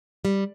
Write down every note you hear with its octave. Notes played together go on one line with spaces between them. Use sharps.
G3